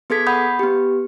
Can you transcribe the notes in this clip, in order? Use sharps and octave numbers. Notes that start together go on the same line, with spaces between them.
B3 G#4 A4 G#6 B6
F#5 B5 D#6 G6
B3 G4